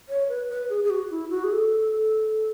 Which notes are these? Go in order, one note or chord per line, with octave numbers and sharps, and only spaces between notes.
C#5
B4
B4
G#4
G#4
F#4
E4
F#4
G#4
A4